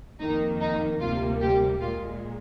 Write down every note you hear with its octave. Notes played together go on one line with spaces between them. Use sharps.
F2 D#3 A#3 D#4
D#4
D2 C3 G3 A#3 F4
G4
A#2 G#3 F4